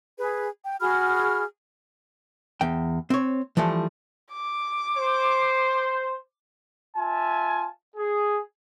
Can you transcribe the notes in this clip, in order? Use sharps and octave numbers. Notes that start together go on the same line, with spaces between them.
G#4 B4
G5
F#4 G#4 B5 F6
E2 G5
C4 C#5
E3 F3 G3 A3
D6
C5
F4 E5 G#5 A5
G#4